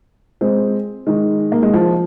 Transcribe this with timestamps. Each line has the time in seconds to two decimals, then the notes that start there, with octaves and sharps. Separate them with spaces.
0.41 G#3 C4
1.07 D#3 G#3
1.52 A#3
1.63 G#3
1.74 F3